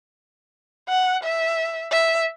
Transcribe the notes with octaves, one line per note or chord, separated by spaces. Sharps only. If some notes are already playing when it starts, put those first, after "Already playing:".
F#5
E5
E5